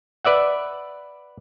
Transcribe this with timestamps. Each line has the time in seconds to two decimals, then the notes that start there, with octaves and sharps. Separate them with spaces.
0.25 B4 D5 E5 F#5